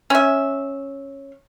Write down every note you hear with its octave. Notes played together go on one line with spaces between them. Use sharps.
C#4 E5